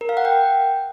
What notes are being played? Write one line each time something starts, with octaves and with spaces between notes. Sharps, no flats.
A#4
F5
F#5
G5